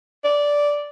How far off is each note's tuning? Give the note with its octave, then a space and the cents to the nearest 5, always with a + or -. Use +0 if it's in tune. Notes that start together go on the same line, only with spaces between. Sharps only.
D5 -10